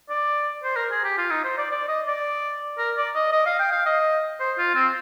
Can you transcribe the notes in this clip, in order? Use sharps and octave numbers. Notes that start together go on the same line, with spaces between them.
D5
C5
A#4
G#4
G4
F4
D#4
C5
D5
D5
D#5
D5
A#4
D5
D#5
D#5
F5
G5
F5
D#5
C5
F4
C4